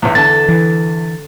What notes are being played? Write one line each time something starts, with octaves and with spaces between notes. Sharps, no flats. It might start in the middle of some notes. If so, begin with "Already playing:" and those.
B1 E2
E2 D3 A5 A6
E3